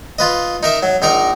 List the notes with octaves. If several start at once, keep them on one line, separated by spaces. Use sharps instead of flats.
F4 B4 D#5
D#4 A#4 E5
F#3
A#1 D#4 A#4 A#5